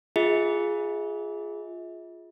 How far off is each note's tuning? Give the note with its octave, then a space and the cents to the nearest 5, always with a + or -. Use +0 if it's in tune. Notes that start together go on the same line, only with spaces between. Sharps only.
F4 +0 G#4 +0 E5 -45